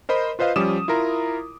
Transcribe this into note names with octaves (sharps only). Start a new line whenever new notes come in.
A#4 C5 D#5 B5
F4 B4 C5 D#5 F5
F3 G3 C#4 D6 D#6 E7
E4 F4 A#4 A#5